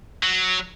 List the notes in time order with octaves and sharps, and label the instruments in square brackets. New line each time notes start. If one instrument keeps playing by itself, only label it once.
[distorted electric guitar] F#3